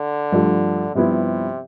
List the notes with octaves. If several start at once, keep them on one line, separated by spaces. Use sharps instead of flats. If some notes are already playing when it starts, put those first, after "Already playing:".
Already playing: D3
G2 F3 A3 D4
G2 C3 F3 B3 E4